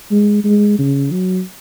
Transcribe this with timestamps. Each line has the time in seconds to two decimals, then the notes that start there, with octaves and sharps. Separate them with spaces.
0.11 G#3
0.44 G#3
0.79 C#3
1.11 F#3